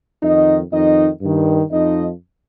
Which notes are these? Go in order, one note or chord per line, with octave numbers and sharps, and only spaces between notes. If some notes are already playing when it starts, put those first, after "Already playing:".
F2 D#3 D#4 D#5
F2 D#3 D#4 D#5
G2 D#3
F2 F3 D#4 D#5